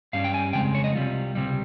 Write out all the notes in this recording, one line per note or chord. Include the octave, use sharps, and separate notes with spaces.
G2 G3 C#4 F5
G5
G#5
F2 C#3 G#3 C4 G5
C#5
D#5
C2 C3 G3 F4
C#2 C3 G3